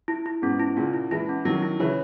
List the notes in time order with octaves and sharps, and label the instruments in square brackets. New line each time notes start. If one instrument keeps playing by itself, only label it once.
[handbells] E4
E4
[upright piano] G#2 B2 [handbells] C#4
[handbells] E4
[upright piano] A#2 C#3 [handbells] C#4
[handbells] E4
[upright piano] E3 G#3 [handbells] E4
[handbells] C#4
[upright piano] D#3 F#3 [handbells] E4
[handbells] E4
[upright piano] C#3 E3 [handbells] C#5